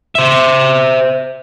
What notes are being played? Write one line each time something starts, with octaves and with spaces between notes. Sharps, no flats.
C5 E5